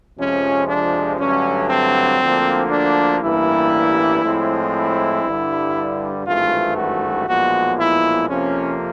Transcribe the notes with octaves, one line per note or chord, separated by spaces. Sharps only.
F2 C3 F3 G#3 C#4
D4
G2 D3 F#3 A3 C#4
C4
D2 D3 F3 A#3
D4
A1 G2 E3 G3 A#3 E4
A2 F3 G#3 C4
E4
G2 D3 G3
G#1 G2 E3 A3 C4 F4
F#4
B1 A#2 F3 G#3 B3 F#4
E4
F2 C3 F3 A#3 C#4